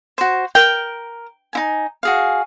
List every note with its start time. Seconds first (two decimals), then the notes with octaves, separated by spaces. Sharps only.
0.18 F#4 C5
0.55 A#4 G5
1.53 D#4 E4 G#5
2.03 F#4 G#4 F5